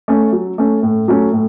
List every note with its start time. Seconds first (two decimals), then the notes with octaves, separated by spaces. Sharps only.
0.08 A3 C#4
0.33 F#3
0.58 A3 C#4
0.83 A2
1.08 F#3 A3 C#4
1.33 A2